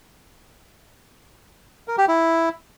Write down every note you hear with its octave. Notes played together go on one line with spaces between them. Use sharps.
A#4
G4
E4